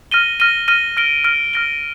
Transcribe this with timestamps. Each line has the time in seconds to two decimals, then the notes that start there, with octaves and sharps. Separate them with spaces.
0.11 F6 A#6 D#7 G7
0.40 F6 A#6 D#7 G7
0.68 F6 A#6 D#7 G7
0.97 F6 A#6 D7 G7
1.25 F6 A#6 D7 G7
1.53 F6 A#6 D7 G7